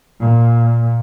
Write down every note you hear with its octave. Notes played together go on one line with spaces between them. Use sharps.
A#2